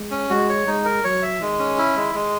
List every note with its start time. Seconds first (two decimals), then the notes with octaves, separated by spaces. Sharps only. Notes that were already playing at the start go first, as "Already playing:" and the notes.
Already playing: G#3
0.11 C#4
0.30 G#3 F#4
0.49 C#5
0.67 G#3 D#4
0.85 A#4
1.04 F#3 C#5
1.22 E5
1.40 D#3 G#3
1.59 C#4
1.78 E4
1.96 G#3
2.15 G#3